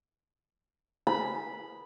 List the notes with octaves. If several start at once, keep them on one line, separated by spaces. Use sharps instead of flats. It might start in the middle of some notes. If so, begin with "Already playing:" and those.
B5